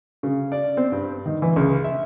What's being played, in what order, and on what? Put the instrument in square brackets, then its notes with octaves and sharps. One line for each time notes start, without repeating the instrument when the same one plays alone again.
[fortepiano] C#3
D5
C4
G2
D#3
E3
C#2
E5